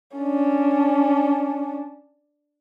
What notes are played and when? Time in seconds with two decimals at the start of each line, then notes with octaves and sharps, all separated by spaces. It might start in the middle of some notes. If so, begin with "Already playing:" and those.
0.18 C#4 D4